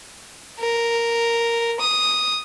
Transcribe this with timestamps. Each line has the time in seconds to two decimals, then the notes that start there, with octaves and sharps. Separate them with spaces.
0.60 A#4
1.80 D#6